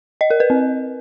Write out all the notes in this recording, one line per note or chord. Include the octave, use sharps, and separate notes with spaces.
D#5
A#4
B4
C4